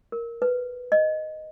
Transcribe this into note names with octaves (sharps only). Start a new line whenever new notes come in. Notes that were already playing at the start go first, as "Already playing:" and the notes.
A#4
B4
D#5